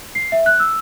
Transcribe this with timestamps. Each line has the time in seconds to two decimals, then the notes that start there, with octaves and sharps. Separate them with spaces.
0.15 C7
0.32 E5
0.46 F#6
0.59 E6